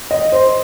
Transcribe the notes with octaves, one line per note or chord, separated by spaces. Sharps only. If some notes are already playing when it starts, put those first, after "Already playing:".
D#5
C5